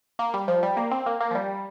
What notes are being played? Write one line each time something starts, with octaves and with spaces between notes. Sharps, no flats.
A#3
G3
F3
G3
A#3
C4
A#3
A#3
F3
G3